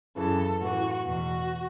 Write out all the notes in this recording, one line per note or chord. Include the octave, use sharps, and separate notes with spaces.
F#2 C#3 E3 A4
A2 E3 F#4
E2 B2 F#4